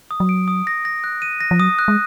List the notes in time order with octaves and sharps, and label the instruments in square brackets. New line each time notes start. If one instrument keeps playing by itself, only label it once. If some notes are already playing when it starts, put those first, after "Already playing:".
[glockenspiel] D#6
[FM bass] F#3
[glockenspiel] D7
D#6
A#6
A#6
F#6
D#7
A#6
[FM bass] F3
[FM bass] F#3 [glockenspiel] D#6
[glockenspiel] F#6
[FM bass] G#3